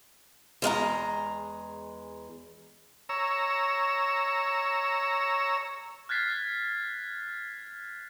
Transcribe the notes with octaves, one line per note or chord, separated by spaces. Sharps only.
E2 G#3 F5 A#5
C#5 A#5 E6
F6 F#6 G#6 A6 B6 C7